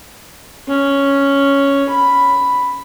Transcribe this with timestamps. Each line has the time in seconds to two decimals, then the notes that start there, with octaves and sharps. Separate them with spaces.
0.68 C#4
1.89 B5